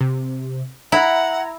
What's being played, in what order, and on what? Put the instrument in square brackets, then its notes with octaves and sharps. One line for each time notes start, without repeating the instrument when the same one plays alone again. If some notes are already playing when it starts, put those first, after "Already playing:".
[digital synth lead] C3
[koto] E4 [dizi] F#5 [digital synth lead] A#5